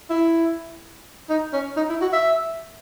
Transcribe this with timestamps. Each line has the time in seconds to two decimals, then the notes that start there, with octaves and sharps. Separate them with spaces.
0.10 E4
1.29 D#4
1.53 C#4
1.77 D#4
1.89 E4
2.01 F#4
2.13 E5